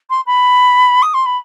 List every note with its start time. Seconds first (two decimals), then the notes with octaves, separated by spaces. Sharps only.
0.10 C6
0.26 B5
1.02 D#6
1.14 C6
1.26 B5